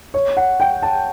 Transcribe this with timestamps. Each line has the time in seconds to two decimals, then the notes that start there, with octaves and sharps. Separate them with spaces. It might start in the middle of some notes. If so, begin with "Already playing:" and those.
0.14 C#5
0.37 F#5
0.60 G5
0.82 A5